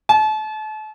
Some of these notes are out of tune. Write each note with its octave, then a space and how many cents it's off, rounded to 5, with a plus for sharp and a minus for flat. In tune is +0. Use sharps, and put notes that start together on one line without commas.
A5 -35